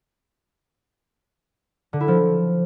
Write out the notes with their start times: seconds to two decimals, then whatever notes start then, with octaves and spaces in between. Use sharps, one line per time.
1.93 D3
2.00 E4
2.08 F3